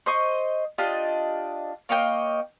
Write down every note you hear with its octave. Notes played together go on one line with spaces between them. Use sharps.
C5 D#5 C#6
D4 F4 G4 D#5
A#3 C#5 D#5 G5